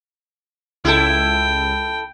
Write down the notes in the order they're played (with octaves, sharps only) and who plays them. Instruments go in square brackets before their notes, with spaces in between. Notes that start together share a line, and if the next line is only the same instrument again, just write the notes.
[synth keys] C#2 [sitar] E4 A4 [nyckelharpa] G5